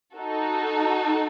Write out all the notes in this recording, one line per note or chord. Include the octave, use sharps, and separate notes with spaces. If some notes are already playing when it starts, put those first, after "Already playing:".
D#4 F#4 A4